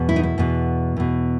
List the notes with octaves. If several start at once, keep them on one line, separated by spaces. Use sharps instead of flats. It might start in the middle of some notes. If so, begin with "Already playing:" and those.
Already playing: E2 B2
E4
D#4
E4
E2 B2
E2 B2